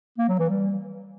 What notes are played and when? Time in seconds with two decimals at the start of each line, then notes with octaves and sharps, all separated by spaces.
0.18 A#3
0.29 F#3
0.39 E3
0.49 G3